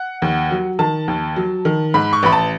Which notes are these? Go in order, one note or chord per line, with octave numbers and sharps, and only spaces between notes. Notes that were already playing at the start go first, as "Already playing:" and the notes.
Already playing: F#5
D#2
F#3
D#3 A5
D#2
F#3
D#3
G#2 B5
C#6
A1 B5
A5